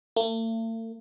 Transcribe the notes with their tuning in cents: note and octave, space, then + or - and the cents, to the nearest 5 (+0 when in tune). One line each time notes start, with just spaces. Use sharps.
A3 +45